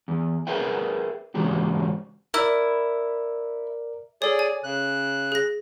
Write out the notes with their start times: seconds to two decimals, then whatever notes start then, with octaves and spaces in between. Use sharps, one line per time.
0.08 E2
0.47 G#4 A#4 B4 E5 F#5 G5
1.35 G#2 C#3 E3 G#3 F#4 G4
2.34 E4 A#4 D5
4.22 G#4 A4 C#5 D5
4.39 G#5
4.64 C#3 F#6
5.32 G#4 A#6